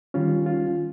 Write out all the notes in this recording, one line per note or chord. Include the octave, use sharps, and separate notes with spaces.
D#3 G3 C#4 F4
F4